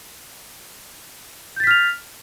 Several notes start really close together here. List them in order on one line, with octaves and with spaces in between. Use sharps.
G6 A6 B6 F6 F7